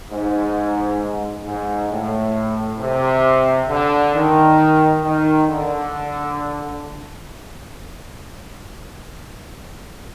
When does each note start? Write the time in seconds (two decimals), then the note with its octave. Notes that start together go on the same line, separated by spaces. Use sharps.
0.10 G#2
1.45 G#2
1.91 A2
2.80 C3
3.69 D3
4.15 D#3
5.04 D#3
5.48 D3